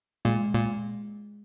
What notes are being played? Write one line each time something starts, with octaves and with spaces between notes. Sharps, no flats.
A#2 G#3
A#2